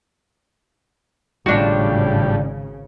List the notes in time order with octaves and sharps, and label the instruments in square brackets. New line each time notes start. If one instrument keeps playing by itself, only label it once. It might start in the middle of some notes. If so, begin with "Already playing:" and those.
[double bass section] G#1 C#3 [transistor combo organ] A2 G3 [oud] D4 F4 F#4